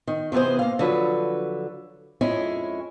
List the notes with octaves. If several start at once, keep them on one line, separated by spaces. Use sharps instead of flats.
D#3
C3 E3 B3 G#4 C5
A#3 F5
D3 F3 F#3 B4
F2 G#3 C#4 E4 G#5